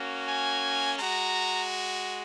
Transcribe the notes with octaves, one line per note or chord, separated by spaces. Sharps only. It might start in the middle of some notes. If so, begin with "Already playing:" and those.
Already playing: A#3 C#4 F#4
G#5
G#3 F#4 A#5